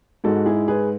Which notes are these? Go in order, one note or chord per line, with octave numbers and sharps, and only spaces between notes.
G#2 G#3 F#4 A4
E4 G#4
G#4 B4